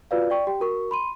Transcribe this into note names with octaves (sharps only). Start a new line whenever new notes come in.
F4 F#4 B4 D5 F5
D5 G5 C#6
G4 G5
F#4 A#4 C#6
B5 C6 D#7